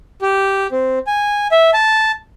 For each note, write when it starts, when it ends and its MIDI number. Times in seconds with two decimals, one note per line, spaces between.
0.22 0.67 67
0.72 0.99 60
1.07 1.48 80
1.52 1.71 76
1.74 2.12 81